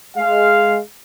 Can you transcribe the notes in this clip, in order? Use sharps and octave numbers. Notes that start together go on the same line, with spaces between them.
G#3 F5